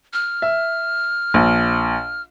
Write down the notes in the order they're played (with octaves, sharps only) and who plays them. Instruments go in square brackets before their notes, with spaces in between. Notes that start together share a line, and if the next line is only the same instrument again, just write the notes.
[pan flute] F6
[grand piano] E5
A#1